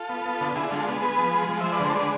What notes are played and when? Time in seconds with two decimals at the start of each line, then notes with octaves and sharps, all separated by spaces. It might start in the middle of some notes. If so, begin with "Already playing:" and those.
Already playing: F4 A4
0.09 B3
0.25 B3
0.41 D3
0.55 D3 E4 G#4
0.71 G#3 F4 A4
0.87 B3
1.02 B3 G#4 B4
1.19 F3
1.34 G#3
1.49 F3
1.60 G#3 C5 E5
1.72 B4 D5
1.80 D3 A4 C5
1.95 G#3 B4 D5